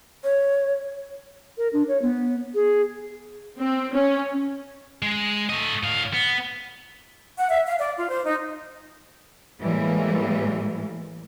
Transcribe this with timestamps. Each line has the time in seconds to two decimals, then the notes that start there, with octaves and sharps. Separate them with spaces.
0.24 C#5
1.58 A#4
1.73 D4
1.88 C#5
2.02 B3
2.55 G#4
3.60 C4
3.95 C#4
5.02 G#3
5.49 A3 D#5
5.83 A2 F5
6.14 B3
7.38 F#5
7.50 E5
7.66 F5
7.78 D5
7.97 F4
8.09 C5
8.24 D#4
9.60 A2 E3 G3 G#3 A#3